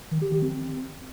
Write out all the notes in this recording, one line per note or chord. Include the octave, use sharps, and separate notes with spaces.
D#3
G4
D#3
C4